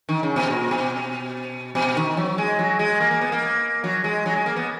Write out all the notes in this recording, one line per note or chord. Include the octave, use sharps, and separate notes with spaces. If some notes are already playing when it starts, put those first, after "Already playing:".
D#3
C#3
B2
A#2
B2
B2
D#3
F#3
G#3
F#3
G#3
A#3
A#3
B3
A#3
F#3
G#3
F#3
G#3
A#3
B3